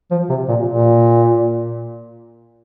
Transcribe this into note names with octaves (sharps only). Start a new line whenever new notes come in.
F3
C3
A#2
A#2